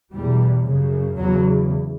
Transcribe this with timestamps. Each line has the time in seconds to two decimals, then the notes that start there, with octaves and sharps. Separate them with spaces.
0.13 E2 B2 G3
0.66 F#2 C#3
1.18 E2 C#3 F#3